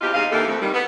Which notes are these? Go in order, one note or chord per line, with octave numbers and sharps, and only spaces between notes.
E2 C3 D#4 F4 G4
G#2 C3 D#5 F5
D#2 D3 E3 A#3 G4 A4
F2 A3
D#3 G3
B3